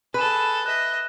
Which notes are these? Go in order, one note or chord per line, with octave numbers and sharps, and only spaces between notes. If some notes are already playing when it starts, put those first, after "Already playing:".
G#4 A4 B4 F#6 E7
D#5 E5 F#6 A#6